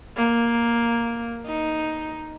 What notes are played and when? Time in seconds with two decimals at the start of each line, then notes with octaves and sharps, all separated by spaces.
0.17 A#3
1.47 D#4